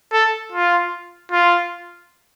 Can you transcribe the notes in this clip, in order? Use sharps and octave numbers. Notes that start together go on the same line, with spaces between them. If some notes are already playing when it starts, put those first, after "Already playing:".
A4
F4
F4